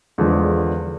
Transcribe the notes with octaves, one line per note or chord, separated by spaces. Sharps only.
E2 D3 F3 G#3